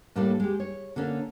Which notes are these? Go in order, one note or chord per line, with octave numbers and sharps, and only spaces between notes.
A2 G3 A3 A#3 D4 A4
G#3 G4
C#5
D3 A#3 C#4 D4